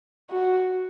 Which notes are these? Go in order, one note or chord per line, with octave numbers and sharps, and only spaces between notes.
F#4